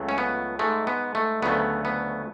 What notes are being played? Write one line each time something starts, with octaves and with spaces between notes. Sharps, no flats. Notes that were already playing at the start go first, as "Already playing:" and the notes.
Already playing: C#2 C#3 F#3 A3
C#4
B3
G#2 G#3 A3
B3
A3
D2 C#3 F#3 A3 B3
B3